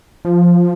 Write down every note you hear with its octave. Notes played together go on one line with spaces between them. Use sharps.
F3